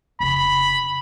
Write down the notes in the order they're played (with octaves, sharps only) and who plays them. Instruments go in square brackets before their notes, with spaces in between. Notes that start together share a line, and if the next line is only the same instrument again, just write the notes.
[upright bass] F1 C#3 [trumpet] B5